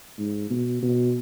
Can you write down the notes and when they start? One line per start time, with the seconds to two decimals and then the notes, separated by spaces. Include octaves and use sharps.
0.18 G#2
0.50 B2
0.83 B2